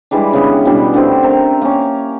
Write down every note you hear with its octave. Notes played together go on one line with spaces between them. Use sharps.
E3 G3 G#3 D4
C#3 B3
B2 E3 G3 D4
D3 A3 C4 G4
C4 A#4 E5
A#3 C#4